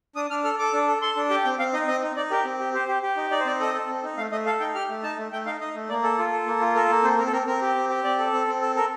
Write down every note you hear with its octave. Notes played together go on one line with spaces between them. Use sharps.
D4 D#6
D4 F6
A4 F6
A4 D6
D4
A4
A4 C6
D4
G4 G5
C4 G5
C4 F5
D#4 D#5
C4 D#5
D#4
D#4 D5
G4 A#4
C4
G4
G4 C5
G4
G4
D#4
D#4 D5
C5
C4 D5
A4 D#5
A4
C4
D#4
A3 F5
A3 D#5
A4 F5
D#4 G5
G4 F6
A3
D#4 A5
A3
A3 G5
D#4 F5
D#4 D#5
A3
A#3 D5
A4
F4
A4
A#3
F4
A4 A#4
A#3
C4 C5
C4 A#4
A4
C4 A#4
C4 A#4
G4
C4
G4
C4 D5
A4
C4
C4
A4
A4 A#4